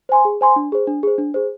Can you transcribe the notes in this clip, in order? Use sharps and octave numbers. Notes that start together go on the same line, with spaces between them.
C5 G#5 C6
G#4
C5 G#5 C6
D4
G#4 C5
D4
G#4 C5
D4
G#4 C5